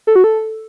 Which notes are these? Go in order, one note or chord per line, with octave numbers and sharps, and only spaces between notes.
A4
F#4
A4